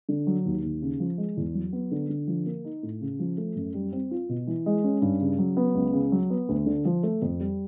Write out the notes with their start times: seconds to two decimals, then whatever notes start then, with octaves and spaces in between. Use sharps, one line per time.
0.09 D3
0.27 F#3
0.45 D#2
0.63 D#2
0.82 C#3
1.00 F3
1.18 G#3
1.37 E2
1.55 F#3
1.73 B3
1.91 D3
2.09 D3
2.27 F3
2.46 A#3
2.65 D#4
2.83 A2
3.01 C#3
3.20 F3
3.37 A3
3.56 F#2
3.74 G3
3.92 C4
4.11 F4
4.29 B2
4.47 E3
4.66 G#3
4.84 C#4
5.02 G2
5.20 C#3
5.38 F#3
5.57 B3
5.75 C#2
5.93 C#3
6.12 F#3
6.30 B3
6.49 D2
6.66 D3
6.85 F3
7.03 A3
7.22 F2
7.40 G3